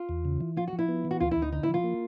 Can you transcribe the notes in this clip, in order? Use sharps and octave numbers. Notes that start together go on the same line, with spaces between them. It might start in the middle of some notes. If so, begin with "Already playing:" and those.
Already playing: F4
E2
C#3
E3
F3 F4
F#4
F3
E4
B3
E3
F#4
D2 F4
E4
D2
D#4
D3 D#4
E4
F3
F4
A#3